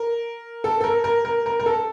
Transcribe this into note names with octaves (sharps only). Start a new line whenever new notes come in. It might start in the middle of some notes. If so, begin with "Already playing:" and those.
Already playing: A#4
A4
A4
A#4
A#4
A#4
A#4
A#4
A4